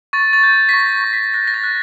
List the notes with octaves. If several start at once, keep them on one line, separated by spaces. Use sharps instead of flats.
C#6 A6
A6
G6
A6
B6
C#6 A#6
C#6
B6
F#6 A#6
A#6
A6
F#6